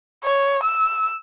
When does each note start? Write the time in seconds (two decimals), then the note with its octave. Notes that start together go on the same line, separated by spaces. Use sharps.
0.25 C#5
0.64 E6